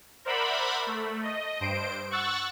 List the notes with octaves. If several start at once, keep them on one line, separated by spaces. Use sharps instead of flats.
A#4 C5 D5 E5 F#5 B5
A3
D#5
G2 C5 D7
F#5 C#6 E6 F#6 A6